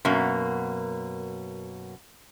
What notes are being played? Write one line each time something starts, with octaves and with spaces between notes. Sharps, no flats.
F#2 B2 A#3